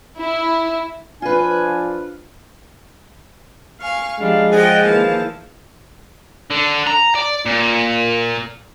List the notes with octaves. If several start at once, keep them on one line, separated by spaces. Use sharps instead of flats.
E4
F3 D4 F4 B4 G#5
F5 G#5 C#6
F3 G3 G#3 D4 F5
F3 G#4 D#5 F#5 G5
D#2 E3 F5 A5
D3
A#5
D5
A#2